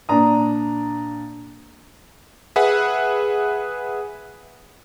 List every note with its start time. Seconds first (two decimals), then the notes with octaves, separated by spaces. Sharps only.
0.09 A#2 D4 D5 A#5 D#6
2.56 G#4 B4 E5 F#5